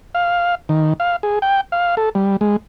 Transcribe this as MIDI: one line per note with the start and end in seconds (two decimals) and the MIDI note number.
0.15 0.55 77
0.69 0.93 51
1.00 1.16 77
1.23 1.39 68
1.42 1.61 79
1.72 1.95 77
1.97 2.09 69
2.15 2.36 55
2.41 2.56 56